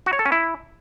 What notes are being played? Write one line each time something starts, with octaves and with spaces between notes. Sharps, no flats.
F#4
C#5
A4
C#4
E4